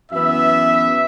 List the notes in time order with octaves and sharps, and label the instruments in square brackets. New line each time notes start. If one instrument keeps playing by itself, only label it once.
[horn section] F#2 E3 B3 E5